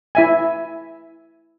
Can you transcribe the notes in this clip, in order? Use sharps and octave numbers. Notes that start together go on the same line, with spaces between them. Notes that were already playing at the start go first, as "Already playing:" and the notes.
E4 E5 G#5